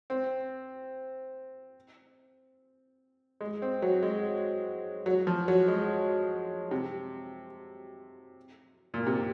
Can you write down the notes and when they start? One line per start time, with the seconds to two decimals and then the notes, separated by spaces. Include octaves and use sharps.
0.10 C4
3.41 G#3
3.62 C4
3.82 F#3
4.03 G#3
5.06 F#3
5.27 F3
5.48 F#3
5.68 G#3
6.71 C3
8.94 A#2
9.06 C3